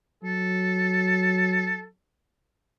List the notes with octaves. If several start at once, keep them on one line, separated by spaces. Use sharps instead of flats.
F#3 A4